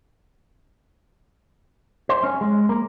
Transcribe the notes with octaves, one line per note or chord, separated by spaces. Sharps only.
C5
C#4
G#3
A#3